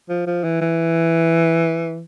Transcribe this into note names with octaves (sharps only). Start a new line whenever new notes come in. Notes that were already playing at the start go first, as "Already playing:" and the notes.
F3
F3
E3
E3